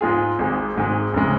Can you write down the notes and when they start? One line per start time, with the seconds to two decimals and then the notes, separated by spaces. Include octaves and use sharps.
0.01 G#2 G#3 F4 G#4
0.39 G#1 G#2 G#3
0.76 G#1 G#2 G#3
1.14 F1 C#3 G#3